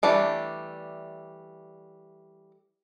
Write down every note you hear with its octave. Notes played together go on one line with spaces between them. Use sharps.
E3 G3 A3 D4